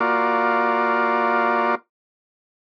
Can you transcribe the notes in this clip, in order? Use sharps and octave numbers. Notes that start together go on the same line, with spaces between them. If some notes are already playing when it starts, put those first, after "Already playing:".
A#3 F4 F#4 D5